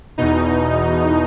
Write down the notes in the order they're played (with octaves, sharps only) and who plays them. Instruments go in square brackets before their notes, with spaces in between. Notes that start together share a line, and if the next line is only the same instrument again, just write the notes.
[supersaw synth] E2 B2 D#4